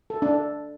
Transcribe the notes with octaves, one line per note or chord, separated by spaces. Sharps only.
A4
D4
A4